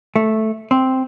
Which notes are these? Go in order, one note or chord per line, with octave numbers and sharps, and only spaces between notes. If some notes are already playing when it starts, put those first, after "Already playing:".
A3
C4